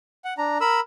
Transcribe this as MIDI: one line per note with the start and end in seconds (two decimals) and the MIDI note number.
0.25 0.33 78
0.38 0.58 62
0.38 0.58 82
0.61 0.80 70
0.61 0.80 83
0.61 0.80 88